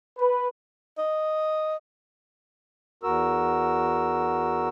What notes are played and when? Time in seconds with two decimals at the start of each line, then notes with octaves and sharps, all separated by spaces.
0.18 B4
0.98 D#5
3.03 E2 F#4 A#4 E6